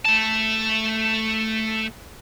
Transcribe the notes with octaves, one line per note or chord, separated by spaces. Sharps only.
A3 A5